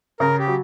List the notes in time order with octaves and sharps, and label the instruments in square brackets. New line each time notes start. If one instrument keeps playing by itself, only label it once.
[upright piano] C#3 [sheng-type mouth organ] A#4
[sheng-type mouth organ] G4
[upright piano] F#3